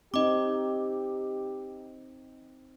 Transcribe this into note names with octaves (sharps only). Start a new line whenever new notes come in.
C4 D#4 G4 D#5 D6